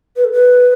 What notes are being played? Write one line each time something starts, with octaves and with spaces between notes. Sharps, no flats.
B4
A4
B4